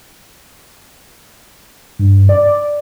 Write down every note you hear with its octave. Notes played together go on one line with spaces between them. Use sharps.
G2
D5